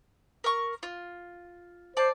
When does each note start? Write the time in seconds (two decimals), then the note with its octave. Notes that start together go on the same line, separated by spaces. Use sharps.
0.44 A#4 C#6
0.83 F4
1.97 C5 D5 A5